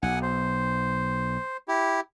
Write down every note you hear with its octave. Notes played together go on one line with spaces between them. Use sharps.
B1 F#5 G#5
C5
E4 G4